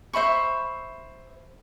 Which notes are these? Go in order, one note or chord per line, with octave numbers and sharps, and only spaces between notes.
C5 E5 B5 C#6